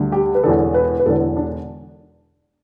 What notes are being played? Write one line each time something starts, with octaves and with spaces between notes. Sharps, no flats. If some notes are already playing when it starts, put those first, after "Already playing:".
Already playing: D2 D3 G3
G4
B4
E1 E2 D3 A4
B4
B4
E1 E2 D3 A4
D4